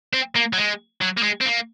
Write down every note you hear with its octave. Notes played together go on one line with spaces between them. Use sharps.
C4
A#3
F#3
G#3
F#3
A#3
G#3
C4
A#3